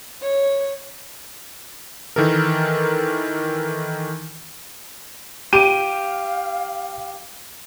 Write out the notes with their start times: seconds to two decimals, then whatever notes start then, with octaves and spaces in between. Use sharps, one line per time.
0.22 C#5
2.16 D#3 E3 A4 A#4
5.53 G4 F5 D#7